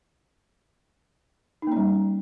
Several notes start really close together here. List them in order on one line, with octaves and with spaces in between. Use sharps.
D#4 A#3 C#4 G3